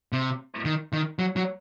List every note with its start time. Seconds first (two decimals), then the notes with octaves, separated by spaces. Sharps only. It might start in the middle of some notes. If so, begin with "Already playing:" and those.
0.13 C3
0.65 D#3
0.93 D#3
1.19 F#3
1.36 F#3